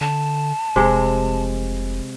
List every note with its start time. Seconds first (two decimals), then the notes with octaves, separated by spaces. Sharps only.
0.01 D3 A5
0.76 F1 C3 G#3